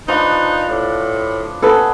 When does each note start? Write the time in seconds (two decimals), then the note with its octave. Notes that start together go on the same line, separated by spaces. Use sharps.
0.08 F3 D4 D#4 B4
0.69 A2 D5
1.62 B3 G#4 A4 B4